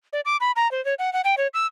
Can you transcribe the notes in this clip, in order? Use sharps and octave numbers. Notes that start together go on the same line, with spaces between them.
D5
D6
B5
A#5
C5
C#5
F#5
F#5
G5
C#5
E6